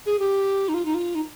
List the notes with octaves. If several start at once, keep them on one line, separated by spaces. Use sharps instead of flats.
G#4
G4
D#4
F4
D#4
F4
D#4